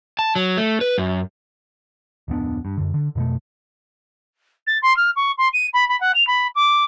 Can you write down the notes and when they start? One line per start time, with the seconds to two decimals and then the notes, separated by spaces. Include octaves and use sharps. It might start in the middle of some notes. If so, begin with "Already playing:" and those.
0.19 A5
0.36 F#3
0.57 A3
0.81 B4
0.98 F#2
2.28 D1 F2 B3 D4
2.65 G2
2.77 F#2 D3
2.94 D3
3.15 F2 B2 A3
4.67 A6
4.82 C6
4.97 F6
5.16 C#6
5.38 C6
5.53 D#7
5.74 B5
5.89 B5
6.01 F#5
6.15 F7
6.27 B5
6.55 D6